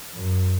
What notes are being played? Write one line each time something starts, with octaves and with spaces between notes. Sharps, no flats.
F#2